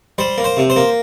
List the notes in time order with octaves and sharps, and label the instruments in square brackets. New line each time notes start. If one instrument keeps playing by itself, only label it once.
[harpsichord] G3 C5
A#3
C5
C3
C5
A#3